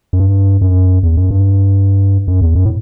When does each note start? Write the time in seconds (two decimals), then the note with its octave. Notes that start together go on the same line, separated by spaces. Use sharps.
0.13 F#2
0.20 G2
0.61 F#2
1.03 E2
1.17 F#2
1.30 G2
2.28 F#2
2.41 E2
2.55 F#2
2.65 A2